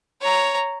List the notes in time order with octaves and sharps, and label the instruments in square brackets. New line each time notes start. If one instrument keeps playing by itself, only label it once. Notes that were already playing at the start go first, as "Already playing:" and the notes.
[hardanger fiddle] C#5 A#5